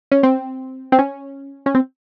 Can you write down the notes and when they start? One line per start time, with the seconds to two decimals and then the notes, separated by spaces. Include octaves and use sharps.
0.12 C#4
0.23 C4
0.92 C4
0.99 C#4
1.66 C#4
1.75 C4